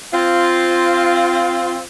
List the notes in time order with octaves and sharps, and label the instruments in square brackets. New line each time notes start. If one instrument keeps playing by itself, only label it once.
[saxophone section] C4 F4